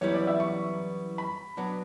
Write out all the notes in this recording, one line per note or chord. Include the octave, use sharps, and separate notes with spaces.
F#2 E3 G3 B3 E4 C#5
D5
E5
C#6
B5
F#3 B3 D4